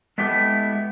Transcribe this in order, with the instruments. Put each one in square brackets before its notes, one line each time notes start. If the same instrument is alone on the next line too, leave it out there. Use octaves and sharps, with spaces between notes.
[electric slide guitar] G#3 A3 B3 E4 G4 B4